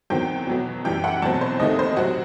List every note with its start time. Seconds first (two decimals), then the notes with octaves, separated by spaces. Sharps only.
0.10 E2 D#3 F#3 C4 G5
0.47 B2 F#3 B3
0.84 F#2 E3 G3 G5
1.04 F#5
1.22 E2 B2 F#3 C4 A5
1.41 C5
1.59 D#2 D#3 A3 C4 D#5
1.79 C5
1.97 C3 F#3 C4 F#4